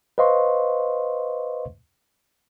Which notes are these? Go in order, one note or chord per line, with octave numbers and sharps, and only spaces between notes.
B4 C5 D#5 F5 C6 C#6